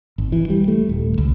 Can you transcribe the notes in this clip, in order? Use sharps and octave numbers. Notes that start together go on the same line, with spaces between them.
G#1
E3
G3
A3
D#1
C#2